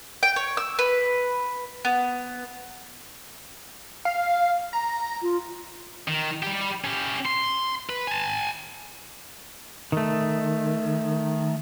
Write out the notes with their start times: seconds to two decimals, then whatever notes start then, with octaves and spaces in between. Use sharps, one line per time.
0.23 G5
0.36 C#5
0.57 E6
0.79 B4
1.85 B3
4.05 F5
4.73 A#5
5.22 F4
6.08 D#3
6.43 G3 G4
6.85 C#4 G4
7.26 C6
7.90 B4
8.07 G#5 A5
9.92 D#3 A3